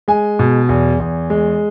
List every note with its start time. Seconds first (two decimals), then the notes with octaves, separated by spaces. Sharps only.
0.08 G#3 G#5
0.39 B2
0.69 E2
1.00 E2
1.30 G#3